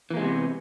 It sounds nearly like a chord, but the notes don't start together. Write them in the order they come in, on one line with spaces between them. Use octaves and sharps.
E3 A#3 G#3 C3 B3